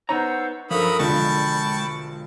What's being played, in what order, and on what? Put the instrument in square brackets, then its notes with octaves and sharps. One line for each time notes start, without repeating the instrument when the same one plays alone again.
[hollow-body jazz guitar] B3 D#4 A#5 [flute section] C5 F#5 E6 [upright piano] C#5
[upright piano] G2 [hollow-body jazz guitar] F3 [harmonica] F#3 B5 D#6 [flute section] A4 A#4
[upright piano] E1 D3 F3 [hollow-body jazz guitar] G#3 [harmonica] G5 A5 C#6 [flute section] B5